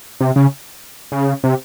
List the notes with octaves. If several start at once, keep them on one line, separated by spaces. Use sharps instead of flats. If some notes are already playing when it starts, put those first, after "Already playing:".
C3
C#3
C#3
C3